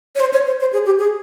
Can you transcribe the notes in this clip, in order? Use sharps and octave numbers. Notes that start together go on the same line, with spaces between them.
C#5
C5
C#5
C5
C5
G#4
G4
G#4